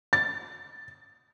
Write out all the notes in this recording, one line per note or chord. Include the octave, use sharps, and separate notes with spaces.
A6